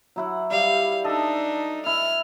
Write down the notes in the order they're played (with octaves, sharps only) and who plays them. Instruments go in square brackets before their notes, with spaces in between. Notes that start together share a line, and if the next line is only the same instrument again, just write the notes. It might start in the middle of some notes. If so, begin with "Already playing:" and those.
[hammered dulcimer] F#3 E4 F#5
[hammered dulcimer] G3 [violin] F5
[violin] D4 D#4 [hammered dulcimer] A4 D#5
[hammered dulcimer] E4 [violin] F6